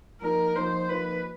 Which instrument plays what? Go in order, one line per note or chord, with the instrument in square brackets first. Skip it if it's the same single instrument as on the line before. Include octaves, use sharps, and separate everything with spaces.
[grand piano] F3 A#3 D#4 [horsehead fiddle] A#4
[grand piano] F3 A#3 D#4 [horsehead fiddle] C5
[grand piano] F3 A#3 D#4 [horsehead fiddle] B4